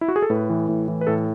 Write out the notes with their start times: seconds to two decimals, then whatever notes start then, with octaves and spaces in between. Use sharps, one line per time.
0.01 E4
0.08 F#4
0.16 G#4
0.22 A4
0.30 A2 B4
0.50 E3
0.69 A2
0.88 E3
1.01 B4
1.07 A2 A4